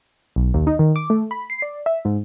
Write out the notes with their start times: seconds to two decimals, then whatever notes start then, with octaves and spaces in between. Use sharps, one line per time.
0.36 B1
0.54 D#2
0.67 D#4
0.79 D#3
0.96 D6
1.10 A3
1.31 B5
1.50 C7
1.62 D5
1.86 E5
2.05 G#2